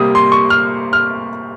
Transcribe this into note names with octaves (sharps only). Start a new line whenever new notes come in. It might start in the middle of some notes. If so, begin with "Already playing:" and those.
Already playing: C3 G3 A#3 D#6
C6
C#6
F6
F6